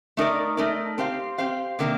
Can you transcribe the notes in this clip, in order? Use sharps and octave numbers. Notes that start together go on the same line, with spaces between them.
A3 D#4 A#4 D5
A3 D#4 A#4 D5
C4 G4 C5 F5
C4 G4 C5 F5
C3 D#3 A#3 D4